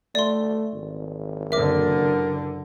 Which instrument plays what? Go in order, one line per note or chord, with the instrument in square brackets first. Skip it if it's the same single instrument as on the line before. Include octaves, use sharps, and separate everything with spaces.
[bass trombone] A3 [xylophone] D5 C6
[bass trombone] G#1
[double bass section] F#1 D3 [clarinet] A#4 [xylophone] E5 D6